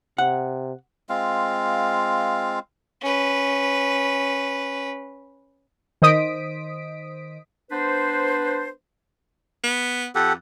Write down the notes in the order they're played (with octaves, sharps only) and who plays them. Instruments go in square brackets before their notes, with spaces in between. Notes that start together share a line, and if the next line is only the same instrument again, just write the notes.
[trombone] C3 [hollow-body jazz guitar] F#5
[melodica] G#3 C4 F4 F5
[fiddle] C#4 B4
[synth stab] D#3 C5 D#5 D#6 B6 D7
[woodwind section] B3 D4 B4 C5
[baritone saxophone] B3
[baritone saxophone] F2 [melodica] G4 A4 F#5